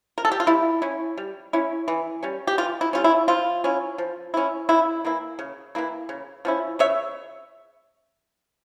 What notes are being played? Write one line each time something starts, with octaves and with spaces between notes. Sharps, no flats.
A#4
A4
G4
F4
G3 E4
C#4 E4
G3
C#4 E4
E3
G3 C#4
G4
E3 F4
E4
G3 C#4 F4
E4
F3 F4
C#4 E4
F3
C#4 E4
C#3 E4
E3 A#3 E4
C#3
E3 A#3 E4
C#3
F3 C#4 E4
C#3 C#5 E5